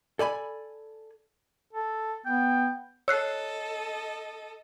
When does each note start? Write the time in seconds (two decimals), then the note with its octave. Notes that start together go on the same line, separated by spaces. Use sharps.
0.19 A4 D5 G#5 B5
1.73 A4
2.26 B3 G5
3.08 A4 C#5 D#5 E6 F#6 C7